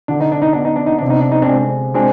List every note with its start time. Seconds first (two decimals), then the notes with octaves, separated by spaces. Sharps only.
0.08 D3 D4
0.21 D#4
0.32 D4
0.42 D#4
0.53 B3 D4
0.65 D#4
0.76 D4
0.86 D#4
0.99 C3 D4
1.10 D#4
1.21 D4
1.32 D#4
1.42 C4 D4
1.48 G#3
1.94 G#3 C4 D4